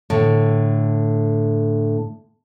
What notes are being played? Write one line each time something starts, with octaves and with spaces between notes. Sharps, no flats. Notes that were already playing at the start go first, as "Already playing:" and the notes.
A2 D3